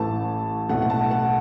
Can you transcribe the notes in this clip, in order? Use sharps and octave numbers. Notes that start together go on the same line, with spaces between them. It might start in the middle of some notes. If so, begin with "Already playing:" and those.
Already playing: A1 A2 E3 A3 A5
B1 A2 A3 F#5
F#5
A5
F#5